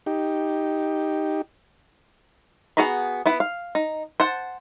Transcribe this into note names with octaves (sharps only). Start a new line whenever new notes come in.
D#4 G4
B3 F#4 G#4 A#5 B5
B3 E4 B4
F5
D#4
C5 F#5 A5